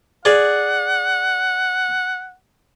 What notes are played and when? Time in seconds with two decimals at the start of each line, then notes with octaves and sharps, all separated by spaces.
0.25 G#4 D5 F#5